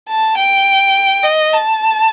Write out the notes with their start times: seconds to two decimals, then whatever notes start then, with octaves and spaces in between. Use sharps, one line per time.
0.09 A5
0.37 G5
1.23 D#5
1.53 A5